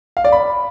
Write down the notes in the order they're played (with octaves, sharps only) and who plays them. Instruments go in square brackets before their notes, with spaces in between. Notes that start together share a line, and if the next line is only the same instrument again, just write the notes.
[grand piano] F5
D5
B5